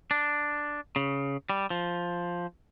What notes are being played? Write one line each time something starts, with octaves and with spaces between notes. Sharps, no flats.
D4
C#3
G3
F3